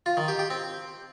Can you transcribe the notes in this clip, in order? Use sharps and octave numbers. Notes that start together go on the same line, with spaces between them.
F4
D#3
G4
G4
C4